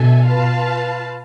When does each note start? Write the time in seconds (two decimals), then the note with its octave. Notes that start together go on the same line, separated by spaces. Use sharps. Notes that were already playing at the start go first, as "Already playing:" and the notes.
Already playing: B2 D4 A4 E5 G#5
0.26 F4 B4 F5 A5